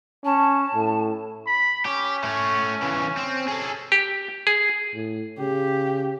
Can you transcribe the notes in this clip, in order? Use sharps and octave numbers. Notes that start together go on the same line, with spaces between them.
C#4 A5
A2
B5
C#4 G4
A3 C#5
C#3 E3
C4
G#4 A4
G4
G#4
A2
C#3 G4